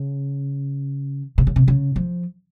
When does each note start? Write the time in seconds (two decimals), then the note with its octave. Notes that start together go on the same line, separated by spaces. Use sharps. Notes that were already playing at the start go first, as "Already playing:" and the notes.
Already playing: C#3
1.38 C3
1.47 C#3
1.56 C3
1.68 C#3
1.96 F3